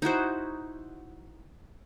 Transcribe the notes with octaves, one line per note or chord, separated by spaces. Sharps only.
D#4 E4 F#4 C5